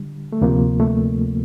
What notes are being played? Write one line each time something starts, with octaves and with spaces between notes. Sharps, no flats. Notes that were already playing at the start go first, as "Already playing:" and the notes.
Already playing: D3 G3
A3
D2 C3 F3 A#3
A3